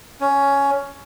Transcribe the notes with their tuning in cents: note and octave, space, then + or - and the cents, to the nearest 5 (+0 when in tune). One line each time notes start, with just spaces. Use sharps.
C#4 +10